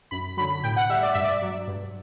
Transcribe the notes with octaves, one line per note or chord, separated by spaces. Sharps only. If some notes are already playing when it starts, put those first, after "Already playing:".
F#2 B5
D3 F#3 B5
A2 G5
F#5
G3 E5
D5
G2 E5
D5
F#3
G2